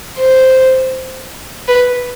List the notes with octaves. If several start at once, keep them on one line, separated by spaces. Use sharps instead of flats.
C5
B4